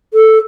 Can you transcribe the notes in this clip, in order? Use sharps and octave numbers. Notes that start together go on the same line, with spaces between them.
A4